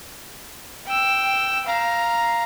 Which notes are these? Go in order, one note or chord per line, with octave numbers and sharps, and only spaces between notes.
G5 E6
F5 A#5